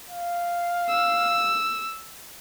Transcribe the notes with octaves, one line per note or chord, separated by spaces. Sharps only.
F5
E6